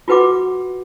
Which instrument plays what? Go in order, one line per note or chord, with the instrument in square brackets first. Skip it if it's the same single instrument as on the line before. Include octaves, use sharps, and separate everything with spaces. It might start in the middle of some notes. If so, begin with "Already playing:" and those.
[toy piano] F4 F#4 B4 F#5 D6